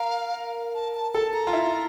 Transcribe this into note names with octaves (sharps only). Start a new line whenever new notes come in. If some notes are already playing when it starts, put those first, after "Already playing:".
Already playing: A#4 F5
A5
A5
A4 A5
A#5
F4
E4